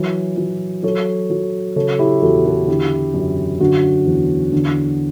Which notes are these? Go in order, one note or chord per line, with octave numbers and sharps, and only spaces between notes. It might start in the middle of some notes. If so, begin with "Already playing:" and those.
Already playing: E3 F#3
F#3
F#3 A4 C#5
F#3
C#3 A4 C#5
E4 G4
E2 F#4 A4
F#4 A4
D3 E4 G4
F#2
D3 F#4
E2
D3